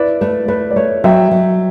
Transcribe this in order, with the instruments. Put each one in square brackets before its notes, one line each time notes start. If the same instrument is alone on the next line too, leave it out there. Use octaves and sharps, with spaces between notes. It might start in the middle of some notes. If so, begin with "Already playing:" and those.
Already playing: [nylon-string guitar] E4 [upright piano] B4 D5
[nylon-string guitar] A3 [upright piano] B4
[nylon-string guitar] A3 [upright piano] B4
[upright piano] D5
[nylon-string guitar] A3 [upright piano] C#5
[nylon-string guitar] F#3 [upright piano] E5 G5
[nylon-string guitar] F#3